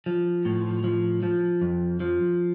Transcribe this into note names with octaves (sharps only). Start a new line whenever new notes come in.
F3
A2
F3
F3
F2
F3